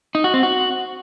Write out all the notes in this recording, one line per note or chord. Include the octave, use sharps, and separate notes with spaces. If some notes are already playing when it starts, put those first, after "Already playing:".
D#4
F#4
C4
F#4